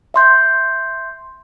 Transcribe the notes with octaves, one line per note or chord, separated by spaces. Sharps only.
E5 C6 G6